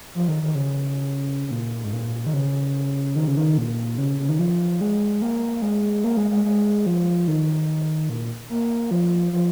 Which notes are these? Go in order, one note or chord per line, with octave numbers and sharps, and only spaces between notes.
F3
D#3
D#3
C#3
C#3
A#2
G#2
A#2
D#3
C#3
D#3
C#3
D#3
A#2
C#3
C#3
D#3
F3
G#3
A#3
G#3
A#3
G#3
G#3
G#3
F3
D#3
A#2
A#3
F3
F3